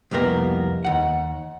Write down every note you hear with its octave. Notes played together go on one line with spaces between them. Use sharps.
C2 F2 A#3 B3 A#4
D#2 F#5